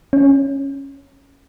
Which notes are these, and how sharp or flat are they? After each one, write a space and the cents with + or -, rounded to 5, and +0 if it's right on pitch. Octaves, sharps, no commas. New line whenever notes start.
C#4 -10